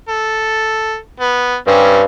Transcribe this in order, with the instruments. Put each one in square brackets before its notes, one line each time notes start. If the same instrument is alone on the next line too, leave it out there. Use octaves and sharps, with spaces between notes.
[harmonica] A4
B3
[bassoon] G2 [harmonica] G3 C4 C#4